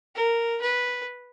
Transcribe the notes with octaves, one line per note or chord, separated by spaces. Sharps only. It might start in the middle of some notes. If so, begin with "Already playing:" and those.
A#4
B4